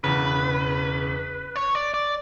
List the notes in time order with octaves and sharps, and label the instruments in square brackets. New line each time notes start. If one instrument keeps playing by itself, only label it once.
[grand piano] E1 E2 C#3 [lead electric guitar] B4
[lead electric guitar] C#5
D5
D5